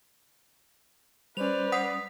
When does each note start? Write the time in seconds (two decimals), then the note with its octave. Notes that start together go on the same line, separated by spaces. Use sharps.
1.37 G3 C#4 B4 C5 D5 F7
1.72 F#5 D#6 B6